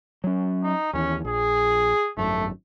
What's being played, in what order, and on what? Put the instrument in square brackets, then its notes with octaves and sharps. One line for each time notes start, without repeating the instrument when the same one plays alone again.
[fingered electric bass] F#3 C#4
[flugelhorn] D#4
[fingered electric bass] D#2 E3 [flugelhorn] C#4
[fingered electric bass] A#1 [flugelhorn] G#4
[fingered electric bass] G#1 F#2 [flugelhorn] A3